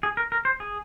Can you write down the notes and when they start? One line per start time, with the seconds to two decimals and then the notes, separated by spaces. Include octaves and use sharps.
0.03 G#4
0.17 A#4
0.32 A#4
0.45 C5
0.60 G#4